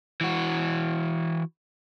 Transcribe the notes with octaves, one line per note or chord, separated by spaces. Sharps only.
E3 F#4